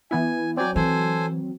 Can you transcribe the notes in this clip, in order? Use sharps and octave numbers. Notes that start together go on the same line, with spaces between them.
E3 B3 E4 G#5
F#3 C4 D5 G5 G#5
E3 A4 C5 G#5